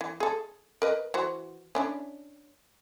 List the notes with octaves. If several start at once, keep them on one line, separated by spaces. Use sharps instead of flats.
E3
G#4 A4
A#4 B4 D#5
E3 F#4 C5
C#4 D4 E4